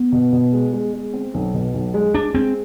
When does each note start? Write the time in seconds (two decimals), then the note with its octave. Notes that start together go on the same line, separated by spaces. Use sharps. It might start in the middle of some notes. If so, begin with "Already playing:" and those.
Already playing: B3
0.12 B2
0.33 B2
0.53 G#3
0.73 G#3
0.94 G#3
1.13 C4
1.34 B1
1.54 B2
1.74 B1
1.94 G#3
2.14 G#3 D4
2.34 G#3 C4